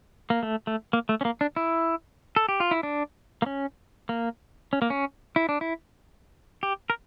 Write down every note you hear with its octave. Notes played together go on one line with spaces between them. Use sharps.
A#3
A3
A3
A#3
A3
C#4
A#3
D4
E4
A4
G4
F4
E4
D4
A#3
C#4
A#3
C#4
A#3
C#4
E4
D4
E4
G4
A#4